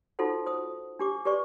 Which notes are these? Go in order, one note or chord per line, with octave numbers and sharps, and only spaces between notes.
D#4 F4 F#4 A4 C5 F#5
C5 D#6
D4 G4 D6
G4 B4 D5 C#6